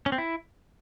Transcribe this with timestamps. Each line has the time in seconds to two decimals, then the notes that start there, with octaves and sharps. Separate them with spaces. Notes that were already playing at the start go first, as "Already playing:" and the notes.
0.06 C#4
0.12 C4
0.18 E4